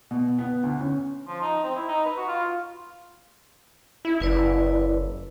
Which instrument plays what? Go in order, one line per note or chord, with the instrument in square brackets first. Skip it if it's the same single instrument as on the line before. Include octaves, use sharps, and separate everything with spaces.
[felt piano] B2
B3
D2
C#4
[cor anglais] F3
D#4
C4
E4
D#4
B4
F#4
F4
[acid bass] E4
[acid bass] F#1 [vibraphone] E4 B4 D5